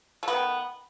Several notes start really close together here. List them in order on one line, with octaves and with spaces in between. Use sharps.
A3 B3 D#3